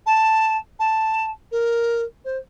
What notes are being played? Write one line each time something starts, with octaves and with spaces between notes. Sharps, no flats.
A5
A5
A#4
C5